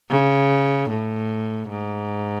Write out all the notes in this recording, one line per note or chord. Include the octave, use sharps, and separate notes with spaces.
C#3
A2
G#2